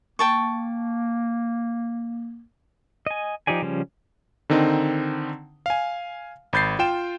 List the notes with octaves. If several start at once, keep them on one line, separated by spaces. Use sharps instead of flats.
A#3 G5 A5 C#6
D#5 G#5
F3 D#4 G4 D5 G#5
C#3 F3 G3 C#4
D3 D#3 C4 D#4
F5 G#5
G#1 B5 G6 A6 C7
F4 G5 E7